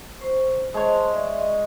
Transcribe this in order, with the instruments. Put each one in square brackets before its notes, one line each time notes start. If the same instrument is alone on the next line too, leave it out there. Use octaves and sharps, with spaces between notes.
[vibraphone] C5 C#6
[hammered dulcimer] G#3 C#5 [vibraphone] C5 A5
[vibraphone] D5 E5
D#5 C#6